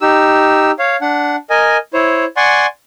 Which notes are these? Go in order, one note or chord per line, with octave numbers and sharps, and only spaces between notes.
D#4 G4 E6
C#5 F5
D4 F#5
A#4 D#5 G#5
E4 C5 C#5
D5 F#5 G#5 C6 C#6